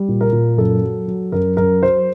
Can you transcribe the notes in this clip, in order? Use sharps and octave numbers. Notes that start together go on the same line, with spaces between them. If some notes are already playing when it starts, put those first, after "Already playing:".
Already playing: G3
A#2
A#4
A#2
F#2 A4
F#3
F#3
F#2 A#4
F#2 A#4
F#3 C5